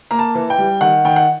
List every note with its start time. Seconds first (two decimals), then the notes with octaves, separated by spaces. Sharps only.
0.11 A#3 A#5
0.19 A5
0.35 E3
0.50 G5
0.58 G3
0.81 D#3 F#5
1.05 D#3 G5
1.16 F#5